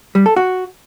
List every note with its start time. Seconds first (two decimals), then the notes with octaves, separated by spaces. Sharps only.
0.15 G3
0.26 A4
0.36 F#4